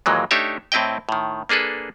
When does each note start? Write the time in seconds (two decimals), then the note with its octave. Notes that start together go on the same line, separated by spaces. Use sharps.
0.06 D#2 A#2 E3 F#3 G#3
0.31 A3 D4 D#4 G4 C#5 E5
0.72 A2 C4 E4 D#5 G5
1.09 A2 D#3
1.49 A#3 D4 G#4 A4 B4